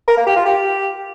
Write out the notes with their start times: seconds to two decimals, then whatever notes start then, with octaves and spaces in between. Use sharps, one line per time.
0.08 A#4
0.17 A#3
0.27 G4
0.36 F4
0.45 G4